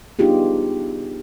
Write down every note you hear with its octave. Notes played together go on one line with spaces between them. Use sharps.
B3 D4 D#4 F4 G4 G#4